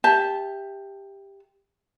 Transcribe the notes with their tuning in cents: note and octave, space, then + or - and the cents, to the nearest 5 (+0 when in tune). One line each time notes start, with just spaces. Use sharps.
G4 +10 E5 +0 A5 -10